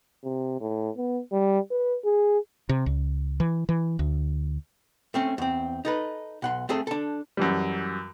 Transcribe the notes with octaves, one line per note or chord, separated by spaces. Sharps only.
C3
A2
B3
G3
B4
G#4
C3
C#2
E3
E3
D2
A3 C4 C#4
E2 C4
D#4 A4 B4
B1 F#5 C6
A3 C4 G#4 A4
D4 A4
F#2 E3 G3